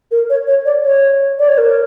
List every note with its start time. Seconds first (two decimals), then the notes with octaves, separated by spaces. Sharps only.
0.11 A#4
0.30 C#5
0.47 C#5
0.65 D5
0.85 C#5
1.39 D5
1.48 C#5
1.58 A#4